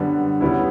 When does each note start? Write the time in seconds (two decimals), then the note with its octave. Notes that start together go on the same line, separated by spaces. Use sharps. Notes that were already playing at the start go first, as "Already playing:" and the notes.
Already playing: F#2 D3 G3 B3 D4
0.41 C#3 G3 B3 E4